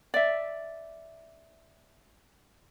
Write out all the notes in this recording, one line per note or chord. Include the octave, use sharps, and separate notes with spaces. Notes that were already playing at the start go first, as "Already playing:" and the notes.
D5 E5